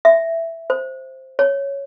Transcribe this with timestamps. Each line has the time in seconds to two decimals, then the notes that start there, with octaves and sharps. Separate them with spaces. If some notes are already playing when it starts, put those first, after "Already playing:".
0.05 E5
0.70 C5
1.39 C#5